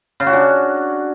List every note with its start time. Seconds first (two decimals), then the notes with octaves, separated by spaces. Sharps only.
0.20 C#3
0.27 F#4
0.33 D4